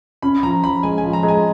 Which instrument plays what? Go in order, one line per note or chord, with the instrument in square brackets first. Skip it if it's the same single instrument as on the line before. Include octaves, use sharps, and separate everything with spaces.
[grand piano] C#4 [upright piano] B5
[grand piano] F3 [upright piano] A#5
[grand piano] F3 [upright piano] B5
[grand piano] G#3 [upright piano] G#5
[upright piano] G#5
[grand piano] F3
[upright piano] A#5
[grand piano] G#3
[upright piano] G#5